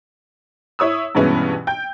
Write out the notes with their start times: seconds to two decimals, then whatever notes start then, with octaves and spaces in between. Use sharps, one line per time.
0.79 E4 C#5 D#6 E6
1.15 G2 B2 E3 G#3 B3 C#4
1.67 G5 G6